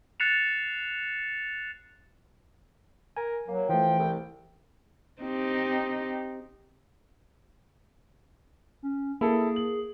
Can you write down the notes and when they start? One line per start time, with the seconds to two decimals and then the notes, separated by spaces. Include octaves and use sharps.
0.20 F#6 A6 C7 C#7 E7 F7
3.17 A#4 G#5
3.48 F#3 A#3
3.69 E3 F3 A3 G5
3.99 C2
5.22 C4 D#4 G4
8.83 C#4
9.21 A#3 E4 G#4 A4
9.56 F#7